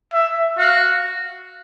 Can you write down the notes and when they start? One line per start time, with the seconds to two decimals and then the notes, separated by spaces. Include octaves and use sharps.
0.13 E5
0.58 F#4 F5